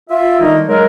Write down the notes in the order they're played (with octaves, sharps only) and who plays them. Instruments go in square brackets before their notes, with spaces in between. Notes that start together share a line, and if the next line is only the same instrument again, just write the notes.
[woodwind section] F4 E5
D3 D#3 G3 A#3 D#4
C#3 F#3 G#3 A#4